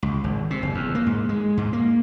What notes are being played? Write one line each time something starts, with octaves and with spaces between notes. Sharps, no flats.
C#2
G#1
C3
F#1
E2
A#3
G#2
G#3
G#2
A#3